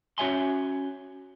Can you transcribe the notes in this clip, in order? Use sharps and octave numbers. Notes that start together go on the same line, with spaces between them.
C#4 F#4 C#5 E5 G#5 C6